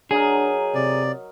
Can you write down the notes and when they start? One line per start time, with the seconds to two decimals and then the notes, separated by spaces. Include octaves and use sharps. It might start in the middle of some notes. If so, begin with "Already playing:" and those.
0.11 F#3 D4 D#4 G#4 A#4
0.75 C3 D5